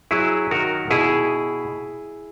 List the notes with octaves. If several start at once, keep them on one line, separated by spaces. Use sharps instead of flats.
F#3 E4 G#4
D#3 F#4 A#4
B2 E4 G#4